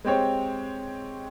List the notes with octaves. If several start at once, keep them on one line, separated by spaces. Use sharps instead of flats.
G#3 C4 G4 C#5